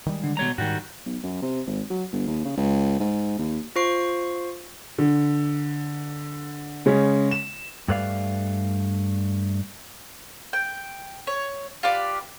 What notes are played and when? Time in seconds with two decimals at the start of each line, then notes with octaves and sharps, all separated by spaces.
0.06 D#3 G3 G#3
0.23 D3
0.37 B2 C#5 A#5
0.58 G#2 D#3 G3 F#4
1.06 B1
1.23 F#2
1.42 C3
1.67 G#1
1.90 F#3
2.12 G1
2.27 D#2
2.45 C#3
2.57 C#2
3.00 G#2
3.38 D#2
3.76 F4 C5 C#6 C7
4.98 D3
6.86 C#3 G#3 C#4
7.31 E7
7.88 G2 A3 B4 D5 F5
10.53 G5
11.27 C#5
11.83 F4 G4 B4 D5